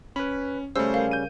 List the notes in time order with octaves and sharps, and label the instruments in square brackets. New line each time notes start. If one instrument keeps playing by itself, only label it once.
[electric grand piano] C#4 [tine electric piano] B4 B5
[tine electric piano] C#3 G3 C#4 [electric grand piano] A3 C5 [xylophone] E6
[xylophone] A#4 F5
[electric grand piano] G6 D#7